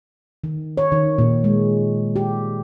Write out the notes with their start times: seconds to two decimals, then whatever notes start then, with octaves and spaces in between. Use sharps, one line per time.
0.44 D#3
0.77 C#5
0.92 D#3
1.18 A#2
1.44 G#3
2.16 G4